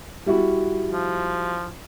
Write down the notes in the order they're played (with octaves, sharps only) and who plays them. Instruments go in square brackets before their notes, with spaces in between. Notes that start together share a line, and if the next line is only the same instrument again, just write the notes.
[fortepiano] G3 E4 F#4
[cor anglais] F3